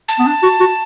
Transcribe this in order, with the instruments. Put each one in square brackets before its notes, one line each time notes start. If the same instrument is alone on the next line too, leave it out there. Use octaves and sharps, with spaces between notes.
[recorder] A5
[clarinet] B3
D4
F#4
F#4